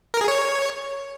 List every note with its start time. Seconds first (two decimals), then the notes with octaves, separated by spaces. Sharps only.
0.14 A#4
0.21 G#4
0.28 C#5